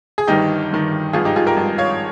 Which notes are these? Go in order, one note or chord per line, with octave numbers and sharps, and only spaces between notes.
G#4
G1 G2 D#3 D#4 G4
G1 G2 D#3
G#1 G2 F3 F4 G#4
D#4 G4
F4 G#4
G4 A#4
G#1 G2 F3
C#5 F5